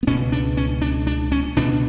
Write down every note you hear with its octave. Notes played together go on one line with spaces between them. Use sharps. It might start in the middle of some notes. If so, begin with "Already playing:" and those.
B3
C#2 B2 C#4
D4
C#4
D4
D4
C#4
C#2 B2 D4